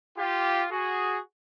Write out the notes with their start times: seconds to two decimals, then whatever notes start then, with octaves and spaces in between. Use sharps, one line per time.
0.17 F4 G4
0.70 F#4 G#4